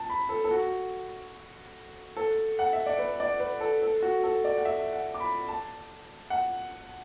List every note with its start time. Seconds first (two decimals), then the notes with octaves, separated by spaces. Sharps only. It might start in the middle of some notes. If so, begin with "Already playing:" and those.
Already playing: A5
0.10 B5
0.29 A4
0.44 A4
0.51 F#4
2.16 A4
2.59 F#5
2.73 E5
2.86 D5
2.99 B4
3.20 D5
3.40 B4
3.60 A4
3.82 A4
4.02 F#4
4.23 A4
4.44 D5
4.58 F#5
4.65 E5
4.93 F#5
5.14 D6
5.20 B5
5.48 A5
6.30 F#5